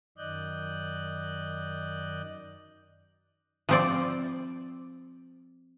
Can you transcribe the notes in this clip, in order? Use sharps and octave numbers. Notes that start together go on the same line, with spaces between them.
F#2 D#3 D5 D#5 F#6 G6
F3 C4 D5